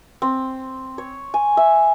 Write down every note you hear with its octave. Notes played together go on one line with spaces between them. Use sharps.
C4
C#5
G#5
E5